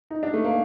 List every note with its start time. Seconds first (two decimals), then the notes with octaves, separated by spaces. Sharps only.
0.11 D#4
0.23 D4
0.34 A3
0.45 A#3